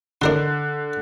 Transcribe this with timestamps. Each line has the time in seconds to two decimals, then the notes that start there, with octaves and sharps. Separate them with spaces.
0.21 D3 D4 A#4 C6